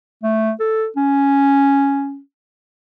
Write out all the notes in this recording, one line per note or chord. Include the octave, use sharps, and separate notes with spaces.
A3
A4
C#4